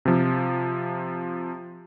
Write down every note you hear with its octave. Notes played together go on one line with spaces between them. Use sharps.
C3 F3